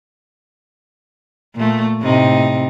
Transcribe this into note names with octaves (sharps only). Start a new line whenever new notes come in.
A#2 A3
A2 C3 D#4